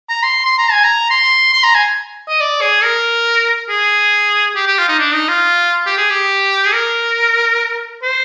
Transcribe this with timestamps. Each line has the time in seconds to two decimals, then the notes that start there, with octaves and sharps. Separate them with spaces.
0.09 A#5
0.23 C6
0.45 C6
0.58 A#5
0.72 G#5
0.84 A#5
1.10 C6
1.53 C6
1.64 A#5
1.75 G#5
2.28 D#5
2.40 D5
2.61 G#4
2.83 A#4
3.69 G#4
4.55 G4
4.67 G4
4.78 F4
4.88 D#4
4.99 D4
5.14 D#4
5.28 F4
5.86 G4
5.97 G#4
6.10 G4
6.66 G#4
6.73 A#4
8.03 C5